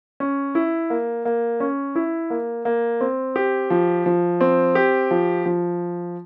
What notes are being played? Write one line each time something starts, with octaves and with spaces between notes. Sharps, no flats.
C#4
E4
A#3
A#3
C#4
E4
A#3
A#3
C4
G4
F3
F3
C4
G4
F3
F3